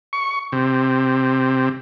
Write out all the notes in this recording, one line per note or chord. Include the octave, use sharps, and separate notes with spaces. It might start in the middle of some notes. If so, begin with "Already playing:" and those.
C#6
C3